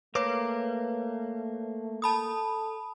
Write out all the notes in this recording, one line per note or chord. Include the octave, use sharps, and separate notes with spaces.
A3 A#3 B4 C#5 D6
A4 A5 B5 D#6